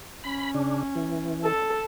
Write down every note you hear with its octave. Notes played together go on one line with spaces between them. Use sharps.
C#4 B5
C#3 D4
E3
A4